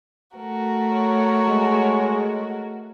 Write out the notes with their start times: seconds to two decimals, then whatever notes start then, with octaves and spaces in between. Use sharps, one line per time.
0.36 A3 F#4 A#4
0.92 C#5
1.48 G#3